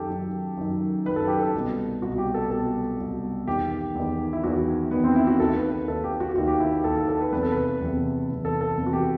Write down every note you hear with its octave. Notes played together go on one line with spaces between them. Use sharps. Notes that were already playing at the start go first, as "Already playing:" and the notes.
Already playing: F#2 D#3 G4 A4
F#2 D#3
F#2 D#3
F#2 D#3 B4
A4
G4
A4
C2 B2
C2 B2 F#4
G4
A4
C2 B2 A4
C2 B2
E2 D#3 G4
E2 D#3
E4
E2 D#3 F#4
E2 D#3 B3
C4
E4
F#4
D#2 D#3 A4
B4
B4
D#2 D#3 A4
G4
F#4
D#2 D#3 F#4
G4
E4
G4
D#2 D#3 A4
A4
A4
B4
E2 C3 E3 B4
A4
B4
E2 C3 E3
E2 C3 E3
A4
A4
E2 C3 E3
F#4
G4